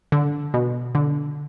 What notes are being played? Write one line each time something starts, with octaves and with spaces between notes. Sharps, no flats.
D3
B2
D3